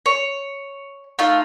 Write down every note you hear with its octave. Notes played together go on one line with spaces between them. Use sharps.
C#5
A3 D#4 F4